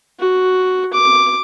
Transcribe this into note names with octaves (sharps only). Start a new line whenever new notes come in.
F#4
D6